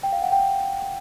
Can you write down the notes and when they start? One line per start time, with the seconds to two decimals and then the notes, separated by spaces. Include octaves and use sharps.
0.03 G5
0.12 F5
0.22 F#5
0.32 G5